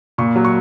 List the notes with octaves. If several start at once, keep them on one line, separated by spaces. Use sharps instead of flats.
A#2 C#6
F#3
C#6